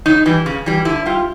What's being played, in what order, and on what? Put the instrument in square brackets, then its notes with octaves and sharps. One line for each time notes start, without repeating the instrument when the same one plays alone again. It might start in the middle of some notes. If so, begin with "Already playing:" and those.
[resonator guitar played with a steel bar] C#3 D#4
E3 G3
C#3
E3 G3
D3 E4
G3 F4